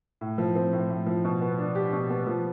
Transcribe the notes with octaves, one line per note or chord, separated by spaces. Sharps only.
A2
F3
C4
A2
A2
F3
B2
B3
D4
G4
B2
B3
F3